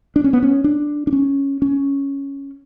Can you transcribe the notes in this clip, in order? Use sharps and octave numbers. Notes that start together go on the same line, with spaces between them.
D4
C#4
B3
C#4
D4
D4
C#4
C#4